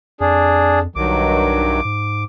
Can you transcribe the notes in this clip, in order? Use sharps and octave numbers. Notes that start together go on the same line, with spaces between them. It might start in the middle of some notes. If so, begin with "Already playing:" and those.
F2 D4 G#4
B1 G2 D#3 F#3 D6
G#2